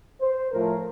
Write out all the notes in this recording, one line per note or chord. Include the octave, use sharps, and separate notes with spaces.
C5
A2 F3 A3 A#4